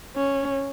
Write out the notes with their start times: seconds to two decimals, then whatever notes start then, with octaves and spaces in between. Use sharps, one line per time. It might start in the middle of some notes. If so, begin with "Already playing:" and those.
0.16 C#4